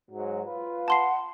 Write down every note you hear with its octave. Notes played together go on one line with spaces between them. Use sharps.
G#2 F#3
F4 B4
F#5 A5 C6 C7